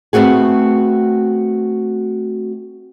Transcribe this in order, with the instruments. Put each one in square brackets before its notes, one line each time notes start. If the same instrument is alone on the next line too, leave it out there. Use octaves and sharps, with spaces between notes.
[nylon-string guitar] A3 B3 C4 F#4 G#4